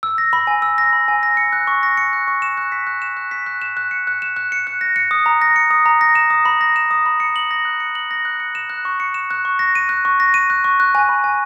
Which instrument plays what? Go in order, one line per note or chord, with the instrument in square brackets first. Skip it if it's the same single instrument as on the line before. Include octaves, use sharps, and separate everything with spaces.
[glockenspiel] E6
A#6
B5
G#5
E6
A#6
B5
G#5
A#6
C#7
F#6
C#6
A#6
C#7
F#6
C#6
E7
F#6
B6
F#6
E7
F#6
B6
F#6
E7
F#6
C#7
F#6
E7
F#6
C#7
F#6
A#6
C#7
D#6
A#5
A#6
C#7
D#6
A#5
A#6
E7
D#6
B5
A#6
E7
D#6
B5
C#7
F#7
A#6
F#6
C#7
F#7
A#6
F#6
C#7
E7
F#6
C#6
C#7
E7
F#6
C#6
A#6
D#7
F#6
C#6
A#6
D#7
F#6
C#6
F#6
G#5
B5
G#5